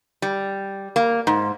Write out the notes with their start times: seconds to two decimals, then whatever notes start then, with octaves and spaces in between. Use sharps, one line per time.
0.22 G3
0.96 A#3
1.27 G#2